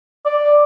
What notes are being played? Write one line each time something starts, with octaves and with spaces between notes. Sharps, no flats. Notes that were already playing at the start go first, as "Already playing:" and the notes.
D5